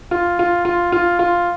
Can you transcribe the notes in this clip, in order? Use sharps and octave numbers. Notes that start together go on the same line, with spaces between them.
F4
F4
F4
F4
F4